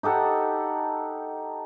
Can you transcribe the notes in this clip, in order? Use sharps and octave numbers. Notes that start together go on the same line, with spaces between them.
D#4 G4 A4 F#5